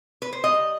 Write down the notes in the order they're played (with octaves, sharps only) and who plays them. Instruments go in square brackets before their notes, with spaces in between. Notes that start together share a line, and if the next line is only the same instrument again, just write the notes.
[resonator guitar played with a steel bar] B4
C5
G3 D#5